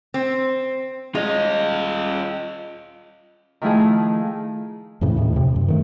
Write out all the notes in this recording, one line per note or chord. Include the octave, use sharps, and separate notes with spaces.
C4
G#3 F4 D#5
D#3 F3 A3 E4 F4 G#4
F2 A2 C#3 E3
D#2 A2
F2 C3
F#2
D#3 G#3 A3